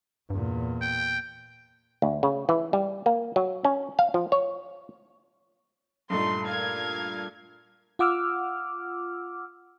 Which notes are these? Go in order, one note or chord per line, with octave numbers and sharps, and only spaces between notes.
E2 G2 A#2
G5
D2
C#3
E3
G3
A#3
F#3
C#4
F5
F3
C#5
G2 A#2 A3 D#4 C6
A#4 F5 G#6
F4 F#5 D6 E6 F6